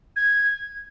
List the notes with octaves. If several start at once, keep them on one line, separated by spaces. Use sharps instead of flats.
G#6